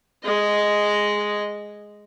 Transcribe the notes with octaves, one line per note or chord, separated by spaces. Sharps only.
G#3 D#5